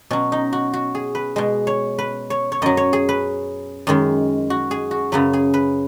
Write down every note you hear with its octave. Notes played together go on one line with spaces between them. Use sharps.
B2 F#3 C#4
D#4
F#4
F#4
G#4
B4
B2 G#3
C#5
B4
C#5
C#5
F#2 F#3 D#5
C#5
G#4
B4
F#2 D#3 G#3
F#4
G#4
F#4
F#2 C#3 F#3 B4
G#4
B4